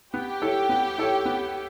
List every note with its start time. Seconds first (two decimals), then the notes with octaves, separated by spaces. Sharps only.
0.14 B3 G4
0.42 E4 A4 C#5
0.69 B3
0.98 E4 A4 C#5
1.25 B3